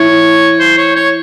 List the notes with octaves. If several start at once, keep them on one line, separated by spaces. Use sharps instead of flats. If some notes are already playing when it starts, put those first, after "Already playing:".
Already playing: E4 C#5
C5
C#5
C#5